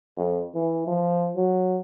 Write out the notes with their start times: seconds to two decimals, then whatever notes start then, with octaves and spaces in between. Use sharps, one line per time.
0.17 F2
0.55 E3
0.87 F3
1.36 F#3